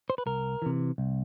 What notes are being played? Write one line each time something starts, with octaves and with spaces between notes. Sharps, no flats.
C5
B4
C2 A#4
C3 E3
C2